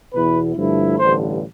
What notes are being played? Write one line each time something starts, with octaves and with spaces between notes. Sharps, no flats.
E2 B2 B3 E4 B4
G2 D3 F3 A3 E4
A1 G2 D3 C5